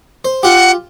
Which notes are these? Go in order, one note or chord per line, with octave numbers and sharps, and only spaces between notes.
C5
F4 G4 F#5